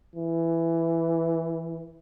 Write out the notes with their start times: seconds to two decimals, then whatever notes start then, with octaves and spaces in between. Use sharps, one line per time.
0.16 E3